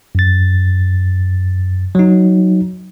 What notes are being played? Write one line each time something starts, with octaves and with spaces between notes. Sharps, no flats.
F#2 A6
F#3 D#4